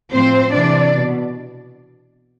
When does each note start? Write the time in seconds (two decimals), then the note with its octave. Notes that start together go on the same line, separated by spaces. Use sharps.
0.13 A2 F3 C4 C5
0.54 C3 E3 D4 D5
0.95 B2